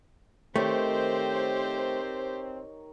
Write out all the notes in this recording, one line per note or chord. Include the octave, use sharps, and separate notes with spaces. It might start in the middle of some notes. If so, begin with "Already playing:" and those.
D#3 A3 C4 G4 A#4 C5 C#5